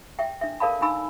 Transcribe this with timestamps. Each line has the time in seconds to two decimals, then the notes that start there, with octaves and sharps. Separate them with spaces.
0.19 E5 G5
0.41 D4 E5
0.60 A4 A#4 D5 F5 A5 B5
0.81 D4 D#4 G#5 B5 E6